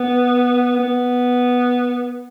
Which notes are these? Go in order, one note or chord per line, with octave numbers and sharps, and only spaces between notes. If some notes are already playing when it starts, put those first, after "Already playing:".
Already playing: B3
B3